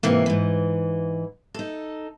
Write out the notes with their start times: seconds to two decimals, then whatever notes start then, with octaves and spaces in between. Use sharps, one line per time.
0.03 G#2 C3 E3 A#3
0.26 G#2 E3
1.54 D#4 A4